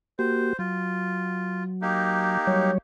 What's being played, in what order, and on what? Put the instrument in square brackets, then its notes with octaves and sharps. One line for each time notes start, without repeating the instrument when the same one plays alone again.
[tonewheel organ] A#3 F#4 G4 [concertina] C5
[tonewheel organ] F#3 [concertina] F4
[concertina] A#3 D#4 G4
[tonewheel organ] F#3 G3 C#5